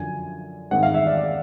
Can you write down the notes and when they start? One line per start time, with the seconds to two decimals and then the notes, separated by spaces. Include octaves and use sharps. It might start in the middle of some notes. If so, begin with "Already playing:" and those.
Already playing: F#2 D3 F3 G#5
0.71 G#2 D#3 G#3 C4 F#5
0.83 F5
0.94 E5
1.07 D5
1.17 D5